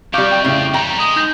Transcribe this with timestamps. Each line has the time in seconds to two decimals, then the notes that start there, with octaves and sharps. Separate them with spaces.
0.14 F2 G3 F5 C#6 D6 G6 D7
0.31 G5
0.44 A2 C#3
0.74 F2 G3 A#5
0.99 G#3 D#6
1.16 D#4 G6 A#6